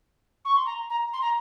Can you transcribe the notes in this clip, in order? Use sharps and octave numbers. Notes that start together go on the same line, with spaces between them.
C#6
C6
A#5
A#5
C6
A#5